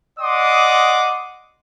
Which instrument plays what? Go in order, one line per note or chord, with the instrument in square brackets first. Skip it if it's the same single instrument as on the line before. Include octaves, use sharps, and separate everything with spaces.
[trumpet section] D5 D#5 F#5 C6 D6 D#6